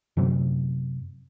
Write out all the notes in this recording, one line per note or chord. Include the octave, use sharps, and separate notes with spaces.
F#2 C3 F#3 C4